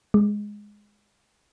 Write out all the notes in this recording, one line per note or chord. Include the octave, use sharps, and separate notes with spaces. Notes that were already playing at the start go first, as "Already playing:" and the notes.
G#3